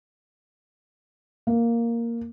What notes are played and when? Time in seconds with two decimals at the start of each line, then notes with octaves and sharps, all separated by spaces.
1.47 A#3